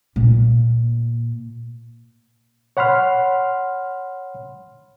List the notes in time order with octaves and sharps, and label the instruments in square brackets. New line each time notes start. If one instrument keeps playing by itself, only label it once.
[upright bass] A#2 A#3
[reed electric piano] C#5 F#5 B5 C6 F6